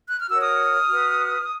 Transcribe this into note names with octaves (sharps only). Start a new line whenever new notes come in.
F#6
F6
F#4 A#4 C#5 E6
D#6 F6
F#4 B4